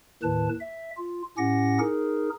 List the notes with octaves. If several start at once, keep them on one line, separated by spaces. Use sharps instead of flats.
D#2 A2 D#3 B4 A5
E5
F4
A2 C#4 G4 F#5 A#6
D#4 G#4 A#4